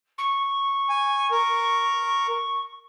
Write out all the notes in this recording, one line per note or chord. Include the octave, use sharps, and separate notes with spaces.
C#6
G#5
A#4